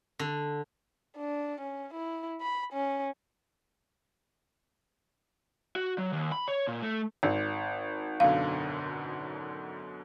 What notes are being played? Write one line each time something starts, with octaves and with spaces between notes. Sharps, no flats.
D3
D4
C#4
E4
B5
C#4
F#4
F#3
D#2
B5
C#5
A#2
A3
G#1
F#2 B2 D3 F5